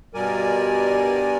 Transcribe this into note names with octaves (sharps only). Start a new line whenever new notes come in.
G2 B2 G3 A#4 D5 G#5